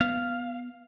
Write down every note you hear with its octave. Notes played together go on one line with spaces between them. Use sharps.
B3 F5